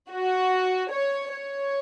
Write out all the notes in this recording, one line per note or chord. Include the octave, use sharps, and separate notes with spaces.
F#4
C#5
C#5